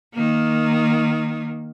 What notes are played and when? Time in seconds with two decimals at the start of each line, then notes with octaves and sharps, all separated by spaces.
0.14 D#3 A#3